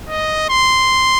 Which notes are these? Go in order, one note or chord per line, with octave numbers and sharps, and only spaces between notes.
D#5
C6